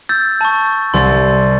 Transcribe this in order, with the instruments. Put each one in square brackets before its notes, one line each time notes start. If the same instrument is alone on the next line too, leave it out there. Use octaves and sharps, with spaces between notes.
[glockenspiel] E6 G6 A6
A5 C#6
[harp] C2 [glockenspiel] C6 A6